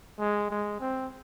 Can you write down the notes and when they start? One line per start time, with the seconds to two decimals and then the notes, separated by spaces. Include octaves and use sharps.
0.20 G#3
0.51 G#3
0.81 C4